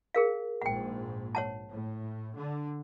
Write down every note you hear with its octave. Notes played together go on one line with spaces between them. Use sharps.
G#4 A#4 F5
A#1 G#2 F#5 G5
C#5 F#5 A5
A2
D3